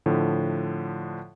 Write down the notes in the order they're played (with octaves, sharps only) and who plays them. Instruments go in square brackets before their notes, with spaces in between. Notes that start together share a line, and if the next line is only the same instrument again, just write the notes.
[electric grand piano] A2 D3 F3